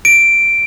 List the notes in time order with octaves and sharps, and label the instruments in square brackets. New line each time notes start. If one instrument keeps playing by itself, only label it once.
[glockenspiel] D7